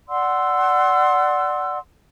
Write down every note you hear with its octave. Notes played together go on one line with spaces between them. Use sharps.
D5 F#5 C6 E6